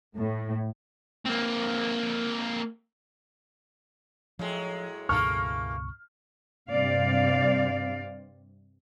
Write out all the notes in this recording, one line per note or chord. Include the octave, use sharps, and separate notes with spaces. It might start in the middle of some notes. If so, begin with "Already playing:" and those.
A2
A#3 C4
A2 F3 F#3 G#3
C#2 G2 B2 E3 A#3 A4 C#6 F6
G2 C3 C4 D5 F5